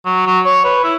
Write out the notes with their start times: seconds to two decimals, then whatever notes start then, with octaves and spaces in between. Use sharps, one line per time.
0.06 F#3
0.27 F#3
0.46 C#5
0.64 B4
0.84 E4